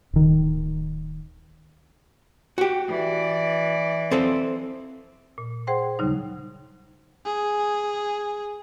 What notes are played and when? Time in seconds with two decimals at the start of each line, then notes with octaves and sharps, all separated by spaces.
0.13 D1 D#3
2.58 F#4 G4
2.88 E3 D5
4.11 C4 A4 C5
5.38 A#2
5.67 G#4 C5 F#5 G5 C6
5.99 D#2 C#3 F#3 G3 D#4
7.25 G#4